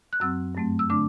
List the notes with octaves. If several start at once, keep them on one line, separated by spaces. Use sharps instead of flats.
F#6
F#2 F#3 C4 E6
G2 F#3 A3 C4
E6
D3 A3 D4 D6